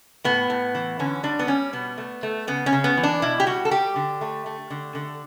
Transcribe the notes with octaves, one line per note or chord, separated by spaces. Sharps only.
A2 B3
A2
E3
D3 C#4
G3 D4
B3
G3 C#4
B2 B3
A3
A3
C#3 B3
C#4
C#3
B3
E3
D4
B2 E4
G4
G3 F#4
A4
G3 G4
D3
A3
A3
D3
D3